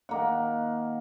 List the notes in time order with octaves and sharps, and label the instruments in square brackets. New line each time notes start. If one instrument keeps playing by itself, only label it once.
[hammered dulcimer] D#3 A#3 F#5